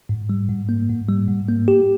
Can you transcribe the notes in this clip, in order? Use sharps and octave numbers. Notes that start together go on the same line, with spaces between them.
G#2
G3
G#2
A#3
G#2
G3
G#2
A#3
G4